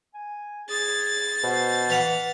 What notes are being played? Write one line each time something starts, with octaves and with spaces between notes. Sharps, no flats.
G#5
G#4 A6
B2 C5
E3 B4 F5 F#5